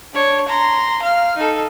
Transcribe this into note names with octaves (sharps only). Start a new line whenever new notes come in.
D4 C#5
A#5 C6
F5 F6
D#4 A4